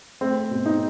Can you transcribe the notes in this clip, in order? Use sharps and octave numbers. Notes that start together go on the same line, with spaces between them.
A3 C4
B2
D#4